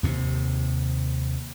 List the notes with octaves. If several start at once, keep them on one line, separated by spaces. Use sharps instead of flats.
D#2 C3